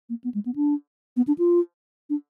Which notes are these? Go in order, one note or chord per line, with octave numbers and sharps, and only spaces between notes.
A#3
B3
G#3
B3
D4
B3
D4
F4
D4